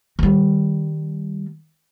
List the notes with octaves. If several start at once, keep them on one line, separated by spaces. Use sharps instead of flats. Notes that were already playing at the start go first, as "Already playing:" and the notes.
D#3 G3